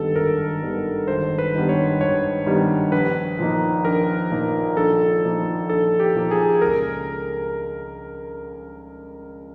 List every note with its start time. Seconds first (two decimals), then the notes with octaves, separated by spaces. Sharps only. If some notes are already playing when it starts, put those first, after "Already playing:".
Already playing: G#1 G2 D#3 G3 B3 A4
0.16 G#1 A#4
0.61 G2 D#3 G3 B3
1.08 G#1 C5
1.38 B4
1.54 G2 D#3 G3 B3
1.69 C#5
2.00 G#1 C#5
2.46 G2 D#3 G3 B3
2.92 A#1 B4
3.38 A#2 F3 A#3 D#4
3.85 A#1 A#4
4.31 A#2 F3 A#3 D#4
4.77 A#1 A4
5.24 A#2 F3 A#3 D#4
5.69 A#1 A4
6.00 G4
6.15 A#2 F3 A#3 D#4
6.31 G#4
6.62 C#2 A#4